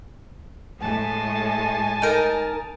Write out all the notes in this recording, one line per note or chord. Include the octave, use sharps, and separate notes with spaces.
A2 G#3 G#5 A5
D#4 A#4